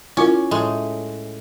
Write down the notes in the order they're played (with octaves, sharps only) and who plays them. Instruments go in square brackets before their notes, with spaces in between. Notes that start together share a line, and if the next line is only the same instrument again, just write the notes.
[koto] C#4 [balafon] E4 F4 A#4
[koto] A2 G#3